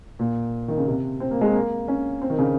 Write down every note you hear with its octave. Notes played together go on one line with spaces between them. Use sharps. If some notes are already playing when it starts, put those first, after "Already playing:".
A#2
D#3
C#3
C3
C4
A#3
G#3
A#3
C#4
C4
D#3
C#3